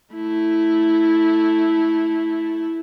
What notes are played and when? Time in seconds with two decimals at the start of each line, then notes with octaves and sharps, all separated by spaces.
0.15 A3 E4